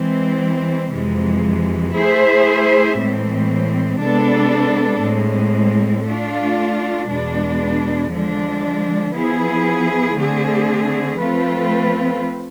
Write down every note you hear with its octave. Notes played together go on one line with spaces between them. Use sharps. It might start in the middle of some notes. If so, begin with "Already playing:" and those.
Already playing: E3 G#3 C4
F2 C3 E3 G#3
A3 E4 G#4 C5 E5
A2 E3 G#3 C4
C3 G#3 B3 D4 A4
A2 G#3 C4
A3 D4 F4
E2 B2 G#3 D4
D3 F3 G#3 D4
F3 B3 E4 G#4
D3 A3 C4 G#4
F3 A3 C4 F4 B4